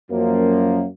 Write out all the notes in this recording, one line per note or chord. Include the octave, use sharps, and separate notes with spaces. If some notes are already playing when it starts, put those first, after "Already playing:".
F#2 F3 A#3